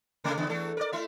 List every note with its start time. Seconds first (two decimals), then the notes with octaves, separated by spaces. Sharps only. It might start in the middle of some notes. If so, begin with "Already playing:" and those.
0.24 C3 A3 A#3
0.37 E2 C#3 B3
0.49 E2 A3 A4
0.77 A#4 D5
0.92 A3 E4 E5